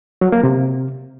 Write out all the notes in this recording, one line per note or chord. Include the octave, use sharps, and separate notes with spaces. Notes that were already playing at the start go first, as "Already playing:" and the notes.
F#3
A#3
C3